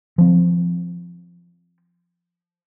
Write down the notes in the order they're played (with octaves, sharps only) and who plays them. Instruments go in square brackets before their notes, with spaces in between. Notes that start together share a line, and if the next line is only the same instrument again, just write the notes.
[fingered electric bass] F3 C4